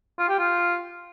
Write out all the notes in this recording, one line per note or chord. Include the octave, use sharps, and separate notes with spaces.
F4
G4
F4